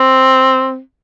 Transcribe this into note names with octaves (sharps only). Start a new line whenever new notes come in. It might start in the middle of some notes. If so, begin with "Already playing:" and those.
Already playing: C4